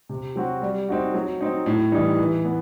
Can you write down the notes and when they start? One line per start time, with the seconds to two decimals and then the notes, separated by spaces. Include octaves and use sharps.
0.09 C3
0.36 F#3 C4 F#4
0.62 G3
0.89 C4 D#4 F#4
1.14 F#3
1.41 C4 D#4
1.66 A2
1.92 E3 G3 D#4
2.19 E3
2.44 B3